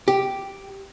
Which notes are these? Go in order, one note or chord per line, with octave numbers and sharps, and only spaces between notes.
G4